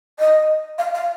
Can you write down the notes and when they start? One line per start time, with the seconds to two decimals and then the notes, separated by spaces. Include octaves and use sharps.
0.20 D#5
0.79 F5
0.95 F5